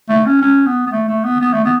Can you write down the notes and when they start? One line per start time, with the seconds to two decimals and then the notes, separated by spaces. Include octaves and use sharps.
0.09 A3
0.26 C#4
0.42 C#4
0.66 B3
0.87 B3
0.91 A3
1.08 A3
1.24 B3
1.40 B3
1.53 A3
1.65 B3